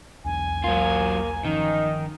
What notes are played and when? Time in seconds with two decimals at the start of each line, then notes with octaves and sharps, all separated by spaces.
0.25 B1 E2 D4 G#5
0.64 F#3 A#3 F4
1.45 G1 D#3 F3 C#4 D#4